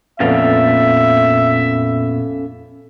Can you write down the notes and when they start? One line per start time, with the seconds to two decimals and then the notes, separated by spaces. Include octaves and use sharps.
0.20 F2 A#2 B3 C#4 A4 E5 F5